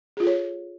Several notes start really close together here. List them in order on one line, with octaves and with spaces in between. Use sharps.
G#4 F4 A4 C#5